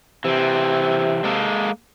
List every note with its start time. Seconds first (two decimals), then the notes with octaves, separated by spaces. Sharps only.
0.25 C3 E3 C4
1.24 G#3 A#3 A4